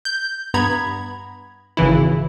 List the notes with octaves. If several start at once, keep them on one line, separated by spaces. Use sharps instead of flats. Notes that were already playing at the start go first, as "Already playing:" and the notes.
G6
G2 B3 A#5 B5 G#6
G#1 C#3 E3 E4